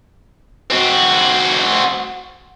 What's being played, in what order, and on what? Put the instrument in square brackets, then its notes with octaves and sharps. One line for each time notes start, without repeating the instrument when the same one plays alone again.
[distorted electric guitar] C4 F#4